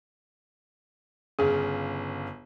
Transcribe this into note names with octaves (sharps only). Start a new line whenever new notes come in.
G1 C#3 G#4